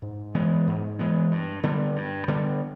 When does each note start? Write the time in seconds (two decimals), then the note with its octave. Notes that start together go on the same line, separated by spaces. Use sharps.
0.02 G#2
0.35 E3 G#3 B3
0.67 G#2
0.99 E3 G#3 B3
1.31 G2
1.63 D3 G3 B3
1.96 G2
2.28 D3 G3 B3